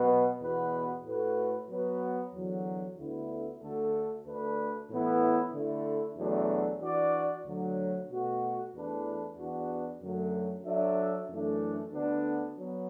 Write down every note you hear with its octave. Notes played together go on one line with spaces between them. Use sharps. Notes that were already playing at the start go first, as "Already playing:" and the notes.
Already playing: B2 F#3 B3
E2 B2 B3 F#4 B4
A2 A3 F#4 B4
F#3 B3 F#4 B4
E2 D3 F#3
D2 D3 B3 E4
D2 D3 A3 F#4 A4
D2 D3 A3 D4 B4
A2 E3 B3 E4
D3 A3 E4
E2 B2 F#3 A3 D4
E3 D4 F#4 D5
D2 D3 F#3
B2 A3 F#4
E2 E3 A3 D4 B4
E2 E3 B3 D4 F#4
F#2 D3 F#3 A3
F#3 D4 A4 E5
F#2 E3 A3 D4
D2 D3 B3 D4
F#3 B3